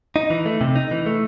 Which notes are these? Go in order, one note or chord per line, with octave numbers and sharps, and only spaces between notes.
D#4
E3
A3
C3
D#4
E3
A3